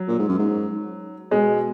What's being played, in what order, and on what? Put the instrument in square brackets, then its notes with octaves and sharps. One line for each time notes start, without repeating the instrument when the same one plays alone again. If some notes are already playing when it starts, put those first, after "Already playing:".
Already playing: [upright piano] F#3
[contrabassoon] A#2
G#2
F#2
G#2
[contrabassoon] B2 [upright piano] G#3